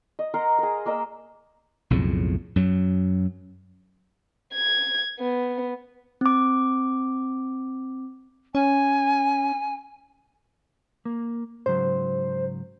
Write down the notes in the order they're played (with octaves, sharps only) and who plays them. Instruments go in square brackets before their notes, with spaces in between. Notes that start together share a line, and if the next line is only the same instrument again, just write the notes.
[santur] D#5
A#4 F#5 A#5 C6
G#4 A#4
A#3 A#4 D#5 E6
[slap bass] B1 F2 A2 C#3
F#2 F#3
[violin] G#6
B3
[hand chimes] C4 D6
[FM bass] C#4 [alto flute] G#5
[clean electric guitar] A#3
[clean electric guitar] G#2 C#3 F#3 [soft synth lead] C5